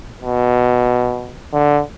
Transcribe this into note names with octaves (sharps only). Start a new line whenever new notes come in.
B2
D3